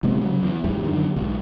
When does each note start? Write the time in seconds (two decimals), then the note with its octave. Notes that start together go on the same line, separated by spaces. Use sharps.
0.03 F#1 C3 G#3 B3
0.21 C#3 F3 F#3
0.43 E2
0.64 F#1 E2 G#2 G3
0.84 F#2 D3 D#3
1.16 B1 G#2